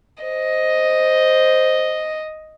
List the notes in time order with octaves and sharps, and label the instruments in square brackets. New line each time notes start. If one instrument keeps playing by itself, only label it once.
[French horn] C5 [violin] D#5